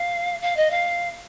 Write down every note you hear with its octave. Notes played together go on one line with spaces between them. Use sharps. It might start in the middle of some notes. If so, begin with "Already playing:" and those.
Already playing: F5
F5
D#5
F5